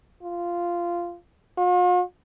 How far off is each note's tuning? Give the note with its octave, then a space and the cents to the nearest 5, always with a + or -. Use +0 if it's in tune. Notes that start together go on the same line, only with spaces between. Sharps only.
F4 -10
F4 +45